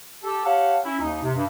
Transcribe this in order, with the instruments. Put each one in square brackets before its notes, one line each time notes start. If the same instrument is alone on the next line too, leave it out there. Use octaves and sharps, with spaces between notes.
[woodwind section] G4 A4
G4 C#5 F5 F#5 A5
C#4 E4
D#2 D#4
C3
G2